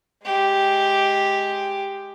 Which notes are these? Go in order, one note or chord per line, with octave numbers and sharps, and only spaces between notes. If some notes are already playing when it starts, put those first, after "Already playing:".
G#3 G4